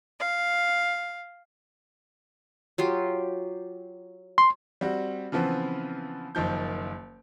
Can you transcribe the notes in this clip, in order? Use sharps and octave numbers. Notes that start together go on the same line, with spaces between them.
F5
F#3 F4 G4
C6
G3 C4 F#4
C#3 E3 F3 B3 C4
F#1 D#3 F3 G6